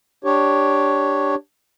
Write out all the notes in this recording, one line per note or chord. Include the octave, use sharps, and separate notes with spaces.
D4 G4 C#5